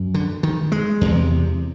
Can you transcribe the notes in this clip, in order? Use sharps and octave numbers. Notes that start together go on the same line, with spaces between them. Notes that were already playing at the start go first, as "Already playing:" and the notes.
Already playing: F#2
D3
D#3
G#3
E2 C3